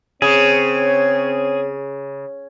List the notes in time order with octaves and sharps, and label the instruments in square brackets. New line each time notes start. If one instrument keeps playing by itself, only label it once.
[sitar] C#3 [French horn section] C4 C#5 [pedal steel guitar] G#4